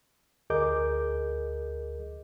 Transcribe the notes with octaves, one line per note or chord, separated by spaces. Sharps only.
D2 G#4 A#4 D#5 D6 G6